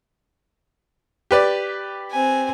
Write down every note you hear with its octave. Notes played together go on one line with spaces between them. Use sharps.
G4 B4 D5
C4 G#5